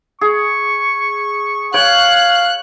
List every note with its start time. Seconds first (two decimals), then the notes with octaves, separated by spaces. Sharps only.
0.21 G#4 C#6
1.74 C#5 F5 G5 F#6